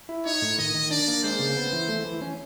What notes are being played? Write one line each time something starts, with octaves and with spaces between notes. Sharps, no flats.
E4
D#4 C#5
A2
D#3 D#5
D#3
D4 D5
A#3
G#3 C5
C#3
B3
E3
A3
E3
C#4